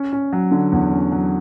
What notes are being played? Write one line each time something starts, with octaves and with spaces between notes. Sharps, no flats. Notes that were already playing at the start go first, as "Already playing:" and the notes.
Already playing: C#4
C#4
F#3
D3
E2
C#4
F#3